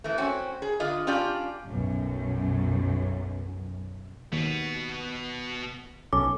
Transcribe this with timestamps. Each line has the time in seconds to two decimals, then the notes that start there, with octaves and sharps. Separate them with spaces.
0.04 E3 A3
0.18 C4 C#4 F#4
0.62 G#4
0.80 D3 F4 D#5
1.07 C#4 D4 F4 G4 D5
1.66 B1 F#2
4.33 D#2 B2 B3
6.13 B1 C#4 A4 D6